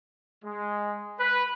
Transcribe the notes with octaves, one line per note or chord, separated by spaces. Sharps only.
G#3
B4